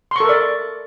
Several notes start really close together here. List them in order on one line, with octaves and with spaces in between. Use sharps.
C6 C#6 A4 A#4 D5